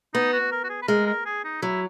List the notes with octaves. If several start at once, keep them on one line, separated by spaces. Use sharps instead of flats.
B3 D#4
F#4
A#4
F#4
G#4
B4
G#3 A#4
A#4
G#4
D#4
F#3 E4